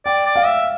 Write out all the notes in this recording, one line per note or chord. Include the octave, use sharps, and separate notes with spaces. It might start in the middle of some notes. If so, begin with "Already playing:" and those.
D5 G5
D5
F5
E5